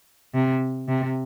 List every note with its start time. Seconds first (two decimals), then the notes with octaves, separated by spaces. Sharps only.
0.35 C3
0.89 C3